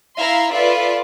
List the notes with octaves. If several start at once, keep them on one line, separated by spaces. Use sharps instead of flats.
E4 E5 F5 A#5 C6
F4 A4 B4 D5 E5